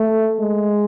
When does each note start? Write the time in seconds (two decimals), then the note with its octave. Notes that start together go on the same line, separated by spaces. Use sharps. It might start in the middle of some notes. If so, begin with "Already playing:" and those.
Already playing: A3
0.39 G#3